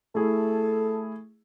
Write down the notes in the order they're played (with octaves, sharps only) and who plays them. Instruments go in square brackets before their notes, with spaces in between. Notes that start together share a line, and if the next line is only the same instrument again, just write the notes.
[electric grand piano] A3 E4 G#4 [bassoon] A4